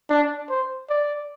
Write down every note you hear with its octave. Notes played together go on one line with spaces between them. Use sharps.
D4
C5
D5